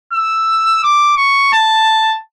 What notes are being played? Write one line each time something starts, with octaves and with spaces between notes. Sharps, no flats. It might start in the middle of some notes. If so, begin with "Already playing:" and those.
E6
D6
C#6
A5